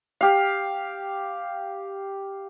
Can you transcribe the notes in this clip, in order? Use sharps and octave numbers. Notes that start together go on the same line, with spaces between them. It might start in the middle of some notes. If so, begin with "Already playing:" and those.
G4 F5